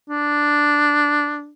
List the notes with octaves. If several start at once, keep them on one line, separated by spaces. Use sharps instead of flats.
D4